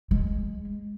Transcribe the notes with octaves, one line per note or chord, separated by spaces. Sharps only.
G#3